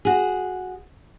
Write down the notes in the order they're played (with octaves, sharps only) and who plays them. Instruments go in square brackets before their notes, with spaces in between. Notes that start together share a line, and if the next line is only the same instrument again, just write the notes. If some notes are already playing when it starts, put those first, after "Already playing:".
[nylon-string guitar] F#4 G#4